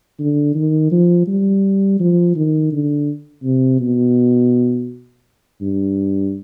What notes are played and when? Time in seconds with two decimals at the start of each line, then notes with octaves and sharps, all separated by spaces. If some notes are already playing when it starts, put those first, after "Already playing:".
0.19 D3
0.55 D#3
0.92 F3
1.28 G3
2.00 F3
2.36 D#3
2.72 D3
3.44 C3
3.80 B2
5.61 G2